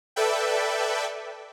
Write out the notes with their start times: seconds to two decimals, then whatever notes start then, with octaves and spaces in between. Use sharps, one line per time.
0.16 A4 B4 D5 E5 G5